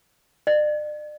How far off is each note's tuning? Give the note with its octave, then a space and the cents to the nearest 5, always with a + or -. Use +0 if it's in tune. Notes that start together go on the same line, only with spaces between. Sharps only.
D5 +40